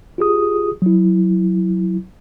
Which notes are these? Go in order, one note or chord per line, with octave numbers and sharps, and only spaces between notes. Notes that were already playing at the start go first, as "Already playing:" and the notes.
F4 G4 G#4 D#6
F#3 E4